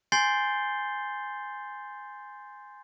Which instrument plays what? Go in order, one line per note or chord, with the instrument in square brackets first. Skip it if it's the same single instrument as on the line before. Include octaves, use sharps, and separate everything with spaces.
[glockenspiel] G#5 C6 G6 A6 C7 G7